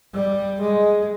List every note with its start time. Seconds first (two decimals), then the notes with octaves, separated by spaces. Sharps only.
0.13 G3
0.61 G#3